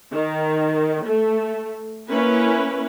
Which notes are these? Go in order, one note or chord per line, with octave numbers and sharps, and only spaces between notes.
D#3
A3
A#3 C#4 E4 B4